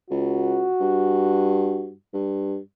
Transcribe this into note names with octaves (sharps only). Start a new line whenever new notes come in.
C#2 F#4
G2
G2